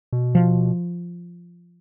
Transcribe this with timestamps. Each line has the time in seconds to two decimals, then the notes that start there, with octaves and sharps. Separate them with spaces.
0.13 B2
0.35 F3